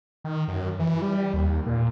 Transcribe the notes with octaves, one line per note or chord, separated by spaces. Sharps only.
D#3
F#2
E3
G3
D#2
A#2